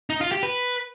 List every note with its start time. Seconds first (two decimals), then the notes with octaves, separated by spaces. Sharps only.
0.10 D#4
0.21 F4
0.32 G4
0.43 B4